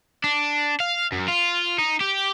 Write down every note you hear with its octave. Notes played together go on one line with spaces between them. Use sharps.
D4
F5
F#2
F4
D#4
G4